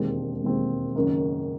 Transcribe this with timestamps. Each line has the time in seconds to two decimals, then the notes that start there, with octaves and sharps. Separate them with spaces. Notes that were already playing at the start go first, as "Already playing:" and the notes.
Already playing: E1 D#2 D#3 G#3 C4
0.43 E1 D#2 D#3 G#3 C4
0.96 F#1 F#2 D#3